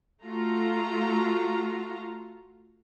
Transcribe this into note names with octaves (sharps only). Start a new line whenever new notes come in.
A3 F4 F#4 A#5